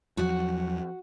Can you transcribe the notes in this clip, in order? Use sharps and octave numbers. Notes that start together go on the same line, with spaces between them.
E2 F3 F#3 F#4 F#5